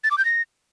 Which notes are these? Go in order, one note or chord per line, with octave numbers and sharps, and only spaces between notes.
A6
D6
G6
A#6